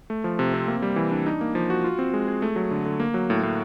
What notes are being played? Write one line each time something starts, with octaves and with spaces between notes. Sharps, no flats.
A3
F3
C3
C4
A#3
G3
E3
D4
D#4
A#3
F3
F#4
F4
C4
G#3
G#4
A3
F#3
D3
D3
A#3
F#3
A2
A2